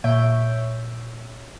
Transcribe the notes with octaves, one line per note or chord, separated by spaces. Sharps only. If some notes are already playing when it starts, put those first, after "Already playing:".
A#2 C#5 E5 G6 D7